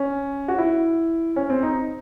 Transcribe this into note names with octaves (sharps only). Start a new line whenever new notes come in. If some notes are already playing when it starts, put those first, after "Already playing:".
Already playing: C#4
F#4
E4
C#4
C4
D#4